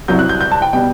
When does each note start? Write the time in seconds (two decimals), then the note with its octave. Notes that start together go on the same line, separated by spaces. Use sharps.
0.08 C2 C3 F#3 G6
0.19 F#6
0.29 G6
0.41 G6
0.51 A5
0.62 G5
0.73 B2 G3 G5